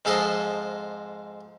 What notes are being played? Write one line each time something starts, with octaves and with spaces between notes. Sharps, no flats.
F2 G#2 F3 A4 C5 D#5